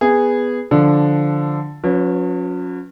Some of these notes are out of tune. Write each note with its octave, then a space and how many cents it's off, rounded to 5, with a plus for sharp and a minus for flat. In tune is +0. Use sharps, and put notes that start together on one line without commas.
B3 +0 G#4 -10
D3 +0 F3 +0 D4 +0
F#3 -45 C#4 +0 B4 +0